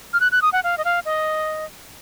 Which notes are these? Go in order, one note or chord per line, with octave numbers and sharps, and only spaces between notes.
F6
F#6
F#6
D#6
F#5
F5
D#5
F5
D#5